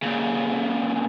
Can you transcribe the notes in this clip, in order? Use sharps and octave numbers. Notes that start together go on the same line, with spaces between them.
A#2 C#3